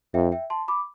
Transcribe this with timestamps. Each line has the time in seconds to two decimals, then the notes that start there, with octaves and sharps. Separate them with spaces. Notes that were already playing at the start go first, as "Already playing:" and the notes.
0.14 F2 E5 G5
0.32 E5 G5
0.50 A5 C6
0.68 B5 D6